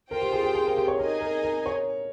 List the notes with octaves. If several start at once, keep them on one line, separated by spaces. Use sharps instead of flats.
F4 A#4 C5 G5
G4
G#4
G4
G#4
A#4
G4
C#5
D#4 G#4 A#4 D#5 G#5
A#4
A#4
C#5